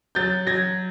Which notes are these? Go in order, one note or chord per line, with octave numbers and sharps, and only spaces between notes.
F#3 G6 A6
F#3 G#6 A#6